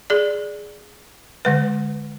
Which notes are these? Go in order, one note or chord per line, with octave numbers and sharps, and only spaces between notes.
G#4 D5
D3 G#3 B4